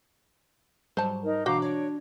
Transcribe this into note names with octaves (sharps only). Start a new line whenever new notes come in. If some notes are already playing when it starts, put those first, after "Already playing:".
G#2 F#3 G3 C5 A5
D#4 A#4
B2 E3 D4 F#4 C5 F5 A#5 D6
C#5 D5 A#6 D7